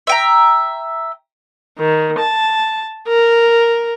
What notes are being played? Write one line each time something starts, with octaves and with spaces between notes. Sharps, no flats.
E5 G5 A#5
D#3
A5
A#4